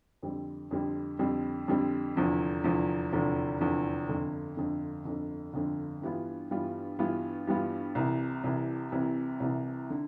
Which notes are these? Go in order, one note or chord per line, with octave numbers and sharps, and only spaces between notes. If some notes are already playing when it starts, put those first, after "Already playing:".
F2 D3 G3 C4
F2 D3 G3 C4
F2 D3 G3 C4
F2 D3 G3 C4
F1 E2 D3 F3
F1 E2 D3 F3
F1 E2 D3 F3
F1 E2 D3 F3
G1 F2 D3
G1 F2 D3
G1 F2 D3
G1 F2 D3
G2 E3 G3 B3 F4
G2 E3 G3 B3 F4
G2 E3 G3 B3 F4
G2 E3 G3 B3 F4
C2 C3 E3
C2 C3 E3
C2 C3 E3
C2 C3 E3
D3